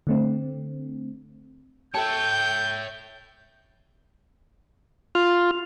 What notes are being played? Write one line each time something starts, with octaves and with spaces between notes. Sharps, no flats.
D3 A3 C4
A4 A#4 C#5 E5 G5 A5 G6
F4